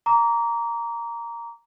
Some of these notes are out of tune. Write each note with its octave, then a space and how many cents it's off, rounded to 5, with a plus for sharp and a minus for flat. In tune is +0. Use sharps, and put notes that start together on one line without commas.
A#5 +0 D6 -30